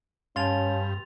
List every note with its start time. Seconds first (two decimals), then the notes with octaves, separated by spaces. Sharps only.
0.36 G2 C#4 F5 G#5 A5 C6 A6 F7